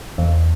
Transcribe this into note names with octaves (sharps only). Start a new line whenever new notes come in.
E2